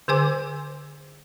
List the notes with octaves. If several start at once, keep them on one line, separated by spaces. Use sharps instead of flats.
D3 G#4 C5 G#5 D6